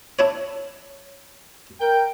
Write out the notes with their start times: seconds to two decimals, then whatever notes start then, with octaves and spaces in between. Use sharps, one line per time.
0.19 D4 E4 C#5
1.80 A#4 G5